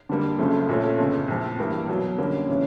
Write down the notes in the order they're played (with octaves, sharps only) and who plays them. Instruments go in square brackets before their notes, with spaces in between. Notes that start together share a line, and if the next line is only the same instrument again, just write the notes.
[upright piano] F2 D3 G3 A#3
F#1 F#2 C#3 F3 A3
A#1 A#2 F3 A3 C#4
G1 F2 C#3
A#1 A2 F3
G2 E3 G3 A#3
B2 F#3 A#3
F2 D3 G3 A#3 C#4
C#3 E3 G#3 C#4